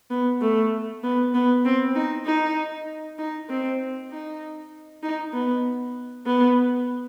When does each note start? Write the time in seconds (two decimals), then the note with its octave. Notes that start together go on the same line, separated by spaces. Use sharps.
0.10 B3
0.41 A3
1.03 B3
1.34 B3
1.65 C4
1.95 D#4
2.26 D#4
3.18 D#4
3.49 C4
4.11 D#4
5.03 D#4
5.33 B3
6.26 B3